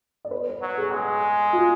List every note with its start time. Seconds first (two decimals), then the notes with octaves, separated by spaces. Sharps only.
0.25 D5
0.31 B4
0.47 B4
0.62 F#3
0.78 G#4
0.92 G#3
1.53 F4